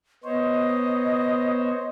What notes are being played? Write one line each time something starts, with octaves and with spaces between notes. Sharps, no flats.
B3 C5 C#5 D#5